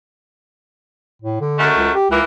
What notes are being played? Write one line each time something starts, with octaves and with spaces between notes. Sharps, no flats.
A2
D3
F#2 G#3 A3
C#2
G4
C#2 E3 A#3